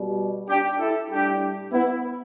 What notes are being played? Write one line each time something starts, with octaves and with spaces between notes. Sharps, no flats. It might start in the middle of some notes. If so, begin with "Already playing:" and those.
Already playing: B2 G3
D4 G4
E4 A4
A2 G3 D4 G4
B3 E4